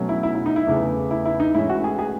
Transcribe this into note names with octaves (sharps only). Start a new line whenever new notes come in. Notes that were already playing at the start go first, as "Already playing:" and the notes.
Already playing: B2 F#3 A3 C#4
E4
E4
E4
D#4
E4
E2 C#3 E3 A3
E4
E4
D#4
G#2 E3 A3 C#4 E4
F#4
G#4
G#4